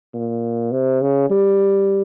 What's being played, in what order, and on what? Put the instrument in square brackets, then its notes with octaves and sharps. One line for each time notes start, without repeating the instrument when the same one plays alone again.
[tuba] A#2
C3
C#3
G3